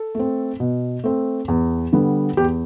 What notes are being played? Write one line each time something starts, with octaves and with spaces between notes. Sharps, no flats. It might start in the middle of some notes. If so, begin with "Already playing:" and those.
Already playing: A4
A3 C4
B2
A3 C4
E2
D3 G3 B3
E2 G4